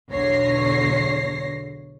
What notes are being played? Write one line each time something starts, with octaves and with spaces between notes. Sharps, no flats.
B1 E2 D3 C#5 A#6 C7